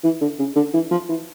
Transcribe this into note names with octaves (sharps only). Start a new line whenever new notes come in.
E3
D3
C#3
D3
E3
F3
E3